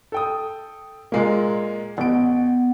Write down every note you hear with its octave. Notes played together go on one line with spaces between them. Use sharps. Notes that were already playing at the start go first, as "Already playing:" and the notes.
A4 G5 D#6
A#2 G#3 A#3
A1 B3 D7